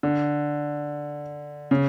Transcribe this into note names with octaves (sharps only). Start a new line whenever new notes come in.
D3
C#3